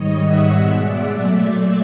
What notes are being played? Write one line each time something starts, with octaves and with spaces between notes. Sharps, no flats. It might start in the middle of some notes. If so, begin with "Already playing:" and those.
Already playing: G#2 D#3 G3 C#5 D#5
E5 F#5
B2 G#3
D5 E5
A#2 F#3 A3 D5 E5
D5 E5